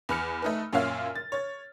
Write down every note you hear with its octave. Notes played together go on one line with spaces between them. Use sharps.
E2 B5 F6 C#7
A3 D#4 B4
F#2 A#2 C#5 E5 F5 F6
A6
C#5 A6